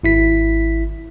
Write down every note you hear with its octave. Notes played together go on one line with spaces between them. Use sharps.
G#1 E4 B6